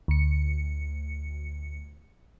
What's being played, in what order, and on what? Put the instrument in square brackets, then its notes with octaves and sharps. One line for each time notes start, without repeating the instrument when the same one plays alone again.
[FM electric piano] D2 C#7